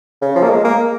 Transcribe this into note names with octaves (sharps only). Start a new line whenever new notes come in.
C#3
F3
A#3
G#3
A#3